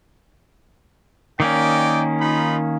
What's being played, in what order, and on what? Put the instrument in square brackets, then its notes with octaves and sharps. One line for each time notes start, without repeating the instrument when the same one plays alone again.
[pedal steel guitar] D#3 A#3 C#4 [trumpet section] D5 D#5 G5
[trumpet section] D#4 F4 B5